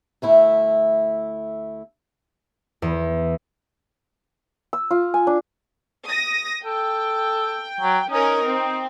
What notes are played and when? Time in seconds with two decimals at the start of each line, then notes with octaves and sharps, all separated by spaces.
0.22 D2 A3 E4
2.82 E2
4.73 E6
4.91 F4
5.14 G#5
5.27 D4
6.08 D#6 A#6
6.65 A4 G5
7.81 F#3
8.11 C#4 D#4 A#4
8.45 C4